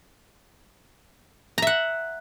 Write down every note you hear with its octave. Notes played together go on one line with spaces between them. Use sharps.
E5 F#5 A#5